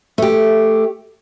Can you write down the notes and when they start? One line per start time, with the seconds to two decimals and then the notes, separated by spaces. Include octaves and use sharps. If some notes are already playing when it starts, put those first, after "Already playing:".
0.18 A3 G4